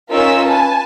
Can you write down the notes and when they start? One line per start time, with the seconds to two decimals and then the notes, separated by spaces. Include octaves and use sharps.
0.11 C#4 D#4 F4 A#4 E6 B6
0.44 B4 G#5 A5